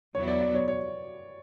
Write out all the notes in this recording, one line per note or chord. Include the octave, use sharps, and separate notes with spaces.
E2 B2 F#3 B3 E4 C#5
D5
D5
C#5
C#5